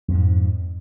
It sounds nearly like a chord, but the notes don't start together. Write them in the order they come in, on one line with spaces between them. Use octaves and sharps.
F2 F3 G#2